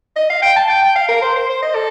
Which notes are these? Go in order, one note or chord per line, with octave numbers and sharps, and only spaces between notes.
D#5
F5
G5
A5
G5
G5
F5
A#4
C5
C5
C5
D#5
A4